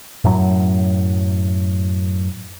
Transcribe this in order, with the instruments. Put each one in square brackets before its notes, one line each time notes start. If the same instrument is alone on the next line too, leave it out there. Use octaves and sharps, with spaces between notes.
[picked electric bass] F#2 A2 F#3